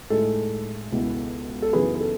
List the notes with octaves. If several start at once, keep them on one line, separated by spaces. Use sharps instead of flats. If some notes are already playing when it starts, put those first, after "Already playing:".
A2 G#3 D#4 A4
C#2 B2 G#3 B3 E4
A4
F#2 C#3 E3 B3 D#4 G#4 B4
B4
A4